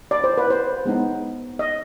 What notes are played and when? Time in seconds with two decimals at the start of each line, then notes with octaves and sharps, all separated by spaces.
0.11 D5
0.24 C5
0.38 B4
0.50 C5
0.85 G#3 B3 D#4
1.59 D#5